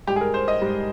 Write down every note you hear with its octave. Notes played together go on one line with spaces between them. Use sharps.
G#2 G3 G4
G#4
A#4
C5
D#5
G#2 G3